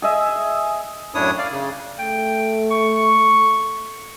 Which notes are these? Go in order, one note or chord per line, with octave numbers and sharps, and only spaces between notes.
G#4 D#5 E5
F#2 A2 D4 E4 C#5 D#6
D5 F5
C#3
A3 G5
C#6